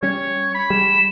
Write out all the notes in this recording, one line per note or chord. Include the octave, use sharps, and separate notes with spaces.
G3 C#4 C#5
B5
G3 G#3 E7